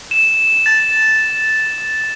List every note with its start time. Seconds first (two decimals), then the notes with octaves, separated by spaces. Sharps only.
0.11 E7
0.66 A6